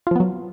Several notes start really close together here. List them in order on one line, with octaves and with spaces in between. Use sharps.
F4 F3 B3 F#3